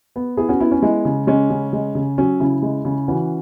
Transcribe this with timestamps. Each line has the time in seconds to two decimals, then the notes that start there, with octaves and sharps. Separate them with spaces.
0.16 B3
0.37 B3 E4 G#4
0.49 C#4 F#4
0.60 B3 E4
0.71 C#4
0.82 G#3 E4
1.05 C#3
1.27 G#3 C#4
1.50 C#3
1.73 G#3
1.95 C#3
2.18 F#3 C#4
2.40 C#3 E4
2.62 G#3
2.85 C#3
3.08 E3 C#4 F#4